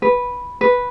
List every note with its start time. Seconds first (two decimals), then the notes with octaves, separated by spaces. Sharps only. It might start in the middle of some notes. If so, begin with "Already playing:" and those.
0.02 B4
0.61 B4